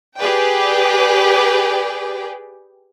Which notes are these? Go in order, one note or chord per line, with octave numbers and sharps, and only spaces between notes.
G4 G#4 B4 D5 G5